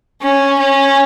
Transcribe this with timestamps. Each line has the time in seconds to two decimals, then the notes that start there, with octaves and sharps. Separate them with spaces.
0.21 C#4
0.58 C#4